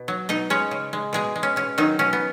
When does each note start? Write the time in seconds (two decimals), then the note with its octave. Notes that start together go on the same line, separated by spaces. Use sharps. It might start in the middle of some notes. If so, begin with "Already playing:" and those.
Already playing: B2
0.08 F#3
0.29 B2 D#4 D#5
0.50 G#3 C#4 C#5
0.71 C#3
0.93 G#3
1.13 B2 G#3 G#4
1.36 G#3
1.43 C#4
1.56 B2 C#4
1.78 D#3 F#3 D#4
1.99 B2 C#4
2.13 B3